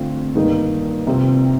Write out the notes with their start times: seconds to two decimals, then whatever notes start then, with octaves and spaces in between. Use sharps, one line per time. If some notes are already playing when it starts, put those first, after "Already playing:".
Already playing: D3 A3 C4 F4
0.35 G2 D#3 A#3 D#4
1.07 C2 C3 F3 C4